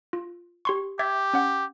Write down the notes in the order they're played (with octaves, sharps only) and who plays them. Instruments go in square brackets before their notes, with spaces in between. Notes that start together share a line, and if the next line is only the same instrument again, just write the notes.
[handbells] F4
G4 C6 C#6
[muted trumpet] G4 [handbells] E5 G#6 A6
[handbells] C#4 F#5